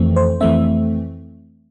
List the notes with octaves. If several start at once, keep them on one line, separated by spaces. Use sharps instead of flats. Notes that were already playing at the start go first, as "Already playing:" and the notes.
Already playing: F2 E3 A3 C4
C5
F2 E3 A3 C4 E5